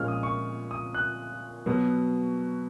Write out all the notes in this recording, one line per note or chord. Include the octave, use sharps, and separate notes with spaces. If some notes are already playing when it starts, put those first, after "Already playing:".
Already playing: A#2 F3 G#3 C#4 F6
D#6
C#6
D#6
F#6
B2 F#3 B3